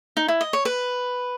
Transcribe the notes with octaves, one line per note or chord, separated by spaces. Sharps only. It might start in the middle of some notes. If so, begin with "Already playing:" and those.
D#4
E4
D#5
C#5
B4